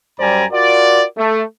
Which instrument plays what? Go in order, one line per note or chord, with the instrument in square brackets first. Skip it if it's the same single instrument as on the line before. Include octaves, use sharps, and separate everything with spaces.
[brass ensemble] F#2 G3 C5 D5 G#5 A#5
F4 F#4 A#4 D5
A3